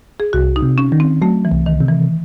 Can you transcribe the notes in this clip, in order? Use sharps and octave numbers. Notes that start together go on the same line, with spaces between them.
G#4
C2 F#4
D#4
C3
C#4
D#3
C4
F#3 A3
E3
C2
D#3
C3
E3